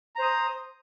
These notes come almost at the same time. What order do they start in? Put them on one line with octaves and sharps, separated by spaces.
A#5 C5 D#6